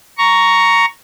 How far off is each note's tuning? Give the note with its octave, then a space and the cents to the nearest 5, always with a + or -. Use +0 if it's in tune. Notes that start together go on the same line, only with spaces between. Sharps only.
A#5 +0 C#6 +10